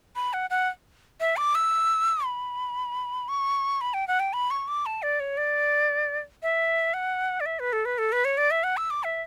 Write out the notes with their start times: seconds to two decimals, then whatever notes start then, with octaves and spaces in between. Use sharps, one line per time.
0.16 B5
0.33 F#5
0.50 F#5
1.20 E5
1.37 D6
1.55 E6
2.25 B5
3.28 C#6
3.81 B5
3.94 G5
4.08 F#5
4.20 G5
4.33 B5
4.51 C#6
4.68 D6
4.86 A5
5.02 D5
5.20 C#5
5.37 D5
6.43 E5
6.94 F#5
7.40 D5
7.46 E5
7.59 B4
7.73 A4
7.85 B4
7.98 A4
8.12 B4
8.25 C#5
8.37 D5
8.51 E5
8.64 F#5
8.77 E6
8.90 D6
9.04 E5